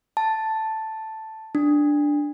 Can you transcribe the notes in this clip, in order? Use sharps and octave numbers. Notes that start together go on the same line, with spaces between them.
A5
D4